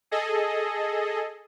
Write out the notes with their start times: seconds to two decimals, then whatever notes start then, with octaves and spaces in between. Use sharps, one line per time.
0.11 G#4 A4 D#5